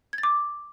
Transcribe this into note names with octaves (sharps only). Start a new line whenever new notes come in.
G#6
A6
D6